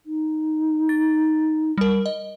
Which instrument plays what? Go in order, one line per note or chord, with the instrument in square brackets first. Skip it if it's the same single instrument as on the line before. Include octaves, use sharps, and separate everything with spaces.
[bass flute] D#4
[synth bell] A6
G3 A#4
D#5